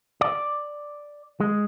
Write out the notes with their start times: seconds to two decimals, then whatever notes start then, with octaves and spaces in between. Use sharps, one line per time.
0.21 D5
1.40 G#3